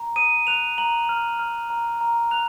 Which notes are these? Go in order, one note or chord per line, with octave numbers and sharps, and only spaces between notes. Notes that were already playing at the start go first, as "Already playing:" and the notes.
Already playing: A#5
D#6 D#7
F#6 F7
A#5 F#7
F6
F6
A#5
A#5
F#6 F7